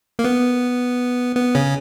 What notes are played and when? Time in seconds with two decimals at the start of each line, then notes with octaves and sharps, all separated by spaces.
0.19 A#3
0.24 B3
1.36 B3
1.55 C#3 C#4